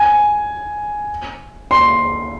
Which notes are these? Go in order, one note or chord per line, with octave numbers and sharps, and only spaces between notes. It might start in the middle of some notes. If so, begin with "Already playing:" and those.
Already playing: G#5
C6